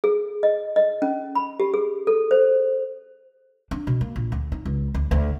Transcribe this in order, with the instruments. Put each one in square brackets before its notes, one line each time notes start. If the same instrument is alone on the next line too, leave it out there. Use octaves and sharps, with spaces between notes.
[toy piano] G#4
D#5
D#5
C#4
B5
G4
G#4
A4
C5
[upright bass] D4
B2
A#3
A#1
D2
D#4
C#2
D2
D2